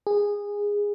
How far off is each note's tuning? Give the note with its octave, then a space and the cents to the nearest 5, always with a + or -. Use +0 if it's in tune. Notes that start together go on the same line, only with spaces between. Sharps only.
G#4 -15